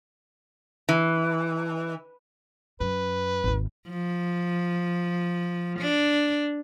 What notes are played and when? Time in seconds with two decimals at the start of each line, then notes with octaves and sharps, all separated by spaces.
0.89 E3
2.80 F#2 B4
3.44 G#1 D#2
3.89 F3
5.79 D4